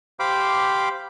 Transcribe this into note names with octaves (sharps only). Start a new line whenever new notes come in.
G4 C5 F5 B5 D6